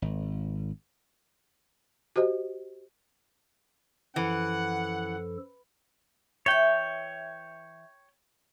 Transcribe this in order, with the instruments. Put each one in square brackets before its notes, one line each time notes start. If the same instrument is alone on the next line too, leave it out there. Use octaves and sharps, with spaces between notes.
[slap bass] G#1
[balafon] F#4 G4 C5 D#5
[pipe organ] F#2 F3 A4 [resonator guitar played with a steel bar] E3 [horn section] F#5
[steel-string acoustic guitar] E3 E5 [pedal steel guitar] C#5 G5